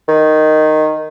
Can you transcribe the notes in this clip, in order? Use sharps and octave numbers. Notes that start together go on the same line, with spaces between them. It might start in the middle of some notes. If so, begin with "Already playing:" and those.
D#3